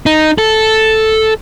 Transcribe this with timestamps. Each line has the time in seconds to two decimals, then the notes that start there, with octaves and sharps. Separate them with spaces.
0.06 D#4
0.38 A4